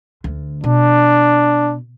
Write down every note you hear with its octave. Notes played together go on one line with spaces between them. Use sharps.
D2
B2 D4